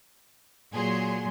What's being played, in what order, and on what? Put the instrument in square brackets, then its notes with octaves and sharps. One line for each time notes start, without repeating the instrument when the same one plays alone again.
[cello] A#2 F#3 [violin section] G#4 C6